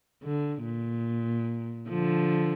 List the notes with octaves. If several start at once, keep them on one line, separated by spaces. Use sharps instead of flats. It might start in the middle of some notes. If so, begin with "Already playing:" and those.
D3
A#2
D3 F3